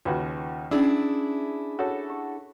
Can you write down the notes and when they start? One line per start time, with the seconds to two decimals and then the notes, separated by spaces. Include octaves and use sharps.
0.05 D#2 C#3 F4 F#4 B4
0.71 C#4 D4 E4 G#4 D5 B5 E6
1.79 F#4 A4 C#5
2.10 G4